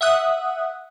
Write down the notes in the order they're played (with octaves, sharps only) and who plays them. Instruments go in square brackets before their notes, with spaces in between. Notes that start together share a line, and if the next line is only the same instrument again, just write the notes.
[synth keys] E5 F#5 D#6 F#6